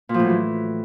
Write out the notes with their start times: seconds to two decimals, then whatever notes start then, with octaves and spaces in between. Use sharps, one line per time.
0.09 A#2
0.14 F3
0.19 A2
0.25 F#3
0.30 E3